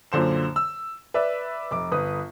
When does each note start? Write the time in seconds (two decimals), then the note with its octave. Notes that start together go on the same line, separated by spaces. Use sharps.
0.12 F#2 A#2 D3 C5 E7
0.56 E6
1.14 B4 D5 E5
1.71 F1 D6
1.92 G1 B4 D#6